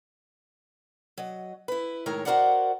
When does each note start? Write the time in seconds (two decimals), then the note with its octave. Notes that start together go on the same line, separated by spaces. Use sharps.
1.18 F#3 D#5
1.68 E4 B4
2.06 A2 D#3 G#3 A#4 C#5
2.25 F#4 A4 A#4 C5 D5 F#5